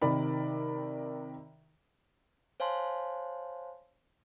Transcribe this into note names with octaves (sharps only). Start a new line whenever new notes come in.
C3 D#3 A#4 D5 B5
C5 C#5 F5 G#5 A5 C6